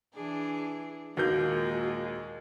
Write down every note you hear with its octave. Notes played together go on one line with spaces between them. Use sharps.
E3 D4 G#4
D#2 A#2 G#3 A#3 F#4 G6